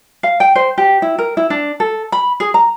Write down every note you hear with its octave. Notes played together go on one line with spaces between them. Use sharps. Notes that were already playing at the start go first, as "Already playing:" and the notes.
F5
G5
C5
G4
E4
A#4
E4
D4
A4
B5
G#4
A#5